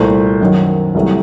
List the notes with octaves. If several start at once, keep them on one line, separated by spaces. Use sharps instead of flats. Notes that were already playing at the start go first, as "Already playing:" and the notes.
Already playing: C2 A#2 A3 A4 C5
F#2 D#3 F#3
C2 C3 F#3 A3